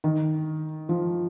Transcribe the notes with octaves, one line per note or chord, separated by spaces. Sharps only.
D#3
F3